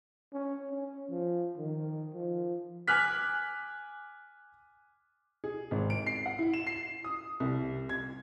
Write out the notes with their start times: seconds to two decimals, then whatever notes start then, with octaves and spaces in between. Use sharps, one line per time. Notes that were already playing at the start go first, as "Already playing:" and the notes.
0.33 C#4
0.71 C#4
1.10 F3
1.58 D#3
2.14 F3
2.88 G#5 D6 F6 F#6 B6
5.44 G#4
5.71 G#1
5.90 D7
6.07 C7
6.26 F#5
6.39 E4
6.54 E7
6.67 C7
7.04 D#6
7.40 C2
7.89 G#6